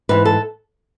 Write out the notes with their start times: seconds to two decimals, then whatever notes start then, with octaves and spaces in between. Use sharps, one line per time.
0.09 G#2 E3 B4
0.25 A4